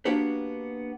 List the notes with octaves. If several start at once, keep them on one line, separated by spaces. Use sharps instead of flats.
A#3 B3 D4 F#4 G4 B4